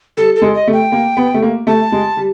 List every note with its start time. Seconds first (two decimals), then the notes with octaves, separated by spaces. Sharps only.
0.17 G3 A4
0.36 A4
0.42 G#3
0.55 D#5
0.68 A3
0.73 G5
0.92 A#3
1.17 B3
1.34 A3
1.42 A#3
1.67 A3 A5
1.92 G#3
2.17 G3